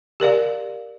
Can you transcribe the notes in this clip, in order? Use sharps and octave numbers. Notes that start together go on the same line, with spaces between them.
G4 A#4 D5 F5